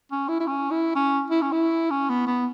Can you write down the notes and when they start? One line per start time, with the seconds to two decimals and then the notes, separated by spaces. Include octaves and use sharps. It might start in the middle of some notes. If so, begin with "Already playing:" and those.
0.12 C#4
0.29 E4
0.40 E4
0.47 C#4
0.71 E4
0.96 C#4
1.31 E4
1.42 C#4
1.52 E4
1.91 C#4
2.10 B3
2.27 B3